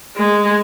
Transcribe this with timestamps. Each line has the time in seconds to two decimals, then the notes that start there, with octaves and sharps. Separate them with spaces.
0.17 G#3